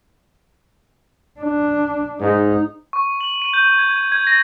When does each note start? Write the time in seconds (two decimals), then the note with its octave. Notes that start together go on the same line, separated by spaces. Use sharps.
1.40 D4
2.20 G#2 D#4
2.93 C#6
3.21 F#7
3.42 D#7
3.53 G6
3.78 G#6
4.12 G#6
4.27 A#6